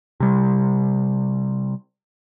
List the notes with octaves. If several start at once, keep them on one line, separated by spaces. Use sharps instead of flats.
C3 G3